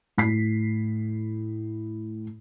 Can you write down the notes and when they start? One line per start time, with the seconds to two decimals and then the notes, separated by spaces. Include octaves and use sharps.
0.18 A2 B6 C7